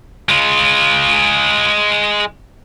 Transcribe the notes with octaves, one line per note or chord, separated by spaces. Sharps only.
G#3 F4